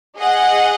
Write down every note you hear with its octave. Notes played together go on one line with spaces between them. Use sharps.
G#4 D#5 F#5